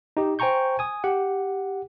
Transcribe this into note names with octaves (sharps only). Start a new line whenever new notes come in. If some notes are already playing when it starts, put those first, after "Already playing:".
D#4 G4
C5 G5 G#5 A#5 C#6 G6
G#5 D#6
G4 F#5